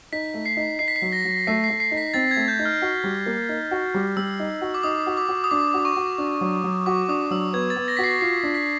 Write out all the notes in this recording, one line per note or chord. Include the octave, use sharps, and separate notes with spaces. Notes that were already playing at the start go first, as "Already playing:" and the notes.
D#4 B6
A3
C7
D#4
D#4 C7
B6
C7
F#3
A#6
F#3
A3 C7
C7
A3
C7
D#4
B6
C4 A6
G#6
A3
G6
D#4
F6
F#4
G3
A#3
D#4
F#4
G3
G3 E6
D#4
F#4
D6
D#4 D#6
F#4
D6
F#4
D#6
D4 D6
F#4 D6
C#6
F#4
D4
F#3
F#3
F#4 D6
D4 D#6
F#3 E6
B3 G#6
A6
B3
A#6
F#4 B6
C7
F4 C7
D4
B6